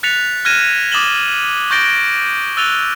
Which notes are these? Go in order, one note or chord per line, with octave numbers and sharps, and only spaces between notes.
F#6 A6 B6 C#7 F7
F6 F#6 G#6 A#6 D#7 E7
D6 D#6 A6 E7 F#7 G7
C#6 G6 A6 A#6 D7 G7
E6 F#6 A6 D#7 F7 G7